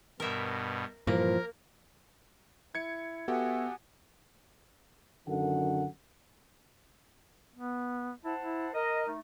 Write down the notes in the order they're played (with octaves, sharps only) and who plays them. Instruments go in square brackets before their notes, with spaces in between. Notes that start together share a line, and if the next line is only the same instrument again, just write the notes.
[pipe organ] G2 B2 [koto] A#4 E5
[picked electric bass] G2 A#2 E3 [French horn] F3 [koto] A#3 [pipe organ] A#4
[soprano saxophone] E4 [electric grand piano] G#6 C#7
[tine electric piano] B3 [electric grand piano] F#4 G4 A4 [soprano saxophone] E5 [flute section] F#5 G#5 D#6
[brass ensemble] F#2 D3 D#3 F#4 A4 F#5
[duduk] B3
[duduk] E4 [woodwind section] C5 F#5 A5
[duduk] E4
[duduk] A#4 [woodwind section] D#5
[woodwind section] A3 D#4